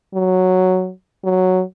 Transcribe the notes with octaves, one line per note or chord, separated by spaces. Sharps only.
F#3
F#3